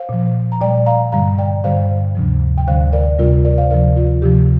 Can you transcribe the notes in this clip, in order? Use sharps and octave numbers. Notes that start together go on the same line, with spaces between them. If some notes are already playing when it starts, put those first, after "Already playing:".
Already playing: C5 F5
A#2 F3
A#5
A#2 G3 D5 G5
F5 A#5
G2 D3 G3 F5 A#5
D5 G5
G2 D3 G3 C5 F5
D2 C3 F3
G5
D2 D3 G3 C5 F5
A#4 D5
D2 C3 G3 F4 A#4
A#4 D5
C5 F5
D2 C3 F3 A#4 D5
F4
D2 C3 F3 G4